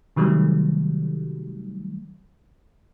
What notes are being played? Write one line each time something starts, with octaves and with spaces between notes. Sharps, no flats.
C3 D#3 F#3 G3 A3